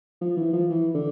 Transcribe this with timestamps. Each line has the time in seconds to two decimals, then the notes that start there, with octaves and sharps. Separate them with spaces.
0.21 F3
0.37 E3
0.53 F3
0.70 E3
0.95 D3